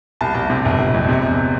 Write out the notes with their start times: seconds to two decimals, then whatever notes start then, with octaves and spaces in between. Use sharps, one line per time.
0.21 C2 A5
0.35 C2
0.50 C3
0.65 G1
0.80 G1
0.94 F2
1.09 C3
1.23 E2